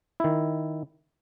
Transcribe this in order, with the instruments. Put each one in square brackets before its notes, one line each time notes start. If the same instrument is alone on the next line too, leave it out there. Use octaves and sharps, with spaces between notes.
[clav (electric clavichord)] D#3 E4